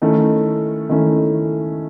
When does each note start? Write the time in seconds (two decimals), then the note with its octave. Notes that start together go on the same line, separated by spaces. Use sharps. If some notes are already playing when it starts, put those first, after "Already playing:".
0.02 D#3 A3 C#4 E4 A4
0.90 D#3 A3 C#4 E4 A4